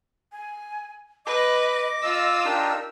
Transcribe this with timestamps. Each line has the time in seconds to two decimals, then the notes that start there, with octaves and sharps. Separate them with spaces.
0.32 G#5
1.26 B4 D#5 D6
2.04 F4 E6
2.45 D4 D#4 G4 A#4